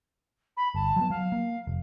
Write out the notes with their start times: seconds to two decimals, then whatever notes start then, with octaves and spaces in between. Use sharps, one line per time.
0.56 B5
0.75 G1 A5
0.96 F#3 G3 B3
1.10 F#3 F5
1.32 A#3
1.67 F1